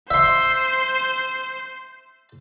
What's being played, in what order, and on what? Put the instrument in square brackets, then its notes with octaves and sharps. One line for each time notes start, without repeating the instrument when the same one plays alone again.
[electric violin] C5 [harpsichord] E5 C6